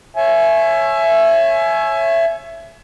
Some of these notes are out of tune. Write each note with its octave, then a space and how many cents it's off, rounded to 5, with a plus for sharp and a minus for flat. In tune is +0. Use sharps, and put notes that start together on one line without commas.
C#5 -20 E5 +15 G#5 +30